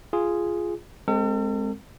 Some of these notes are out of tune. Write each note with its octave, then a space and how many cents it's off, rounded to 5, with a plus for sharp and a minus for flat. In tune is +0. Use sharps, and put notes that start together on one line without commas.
F4 -10 G#4 +0
G#3 +0 C4 +0 A4 +45